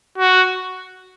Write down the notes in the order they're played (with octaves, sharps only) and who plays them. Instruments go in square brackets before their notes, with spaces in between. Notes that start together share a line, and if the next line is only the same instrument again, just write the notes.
[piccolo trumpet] F#4